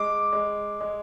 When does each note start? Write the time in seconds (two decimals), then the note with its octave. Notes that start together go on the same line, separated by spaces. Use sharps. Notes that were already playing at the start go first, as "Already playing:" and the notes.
Already playing: G#3 D6
0.33 G#3
0.80 G#3